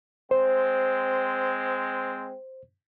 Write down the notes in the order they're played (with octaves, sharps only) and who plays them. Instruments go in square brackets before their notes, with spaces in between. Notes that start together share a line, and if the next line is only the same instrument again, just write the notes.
[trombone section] G#3 C4 [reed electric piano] C5